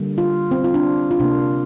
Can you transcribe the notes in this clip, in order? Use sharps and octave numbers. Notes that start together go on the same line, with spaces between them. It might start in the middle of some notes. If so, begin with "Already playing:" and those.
Already playing: D3 G3 A#3
F4
C4
F4
D4
F4
C3 A#3 D4